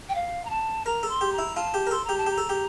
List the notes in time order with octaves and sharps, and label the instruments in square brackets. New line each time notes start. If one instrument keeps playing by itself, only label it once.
[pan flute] G5
F5
A#5
A5
[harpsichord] A#4 [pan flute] A#5
[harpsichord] A4
[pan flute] C6
[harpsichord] G4
[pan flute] A#5
[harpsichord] E4
[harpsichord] F4 [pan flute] A5
[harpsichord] G4
A#4
[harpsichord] A4 [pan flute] C6
[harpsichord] G4 [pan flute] A#5
[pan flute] A5
[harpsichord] G4 [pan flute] A#5
[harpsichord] A4
G4